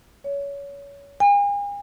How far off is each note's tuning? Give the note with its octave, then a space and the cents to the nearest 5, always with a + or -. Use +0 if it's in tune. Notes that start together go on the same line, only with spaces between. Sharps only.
C#5 +25
G#5 -45